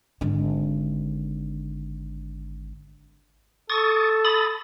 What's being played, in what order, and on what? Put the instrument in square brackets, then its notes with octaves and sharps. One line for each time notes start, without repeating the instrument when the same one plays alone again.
[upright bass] G#1 D3
[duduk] A4 [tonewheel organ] C#6 D#6 A6
[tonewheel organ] B5 D#6 A6